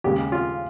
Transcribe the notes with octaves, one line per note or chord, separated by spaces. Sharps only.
D#2 C#3 G#3 G4
F4